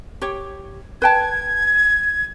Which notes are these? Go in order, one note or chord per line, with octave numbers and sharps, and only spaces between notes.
G4 C#5
B4 G5 A5 G#6